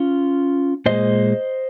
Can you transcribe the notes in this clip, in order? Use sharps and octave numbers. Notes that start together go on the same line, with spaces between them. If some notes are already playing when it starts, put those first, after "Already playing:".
Already playing: C#4 F4
A#2 G#3 C5 D#5